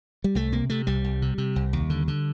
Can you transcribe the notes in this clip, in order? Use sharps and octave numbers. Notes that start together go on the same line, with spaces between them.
G3
C2 A3
C3 A#3
C3 A3
C2 G3
C2
C3
C3
C2
D#2
D3
D3